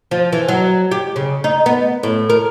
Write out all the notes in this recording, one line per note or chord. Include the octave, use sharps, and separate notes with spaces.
F3
E3
F#3
G4
C#3
D#4
B3
A2
A#4